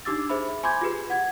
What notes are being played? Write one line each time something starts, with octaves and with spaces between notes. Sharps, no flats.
D4 D#4 G4 D6 E6 A6
G#4 C5 E5 B5
G#5 B5 C6 D6 G6 G#6
F4 G4 G#4 B4
F#5 G#6